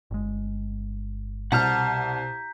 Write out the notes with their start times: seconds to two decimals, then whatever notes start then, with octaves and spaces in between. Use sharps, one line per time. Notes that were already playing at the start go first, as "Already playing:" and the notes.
0.11 G1 G#3
1.52 C2 B2 F#5 A5 A#5 F6 G6 B6